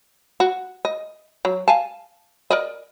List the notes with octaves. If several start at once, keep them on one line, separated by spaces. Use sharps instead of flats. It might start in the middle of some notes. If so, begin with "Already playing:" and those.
F#4
D#5
F#3
F5 G#5 A5
A#4 D5 D#5